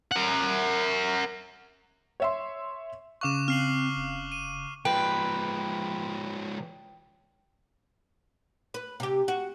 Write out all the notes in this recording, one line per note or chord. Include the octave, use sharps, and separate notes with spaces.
A#4 F#5
C#5 E5 C6
C#3 F5 C#6 D6 F#6 E7
C4 F6 C7 F#7
F1
D#7
F3 G#3 B4 G5
B4
C3 G4
F#4